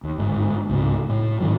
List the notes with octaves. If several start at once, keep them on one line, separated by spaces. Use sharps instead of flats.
D#2
G1 G#2
C#2 G#2 C3
A2 A3
G#2 D#3 E3 F#3